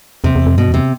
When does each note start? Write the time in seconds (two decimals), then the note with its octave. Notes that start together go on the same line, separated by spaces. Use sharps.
0.24 E2 C3
0.35 E2
0.46 F2
0.58 G2 B2
0.68 E2
0.74 C3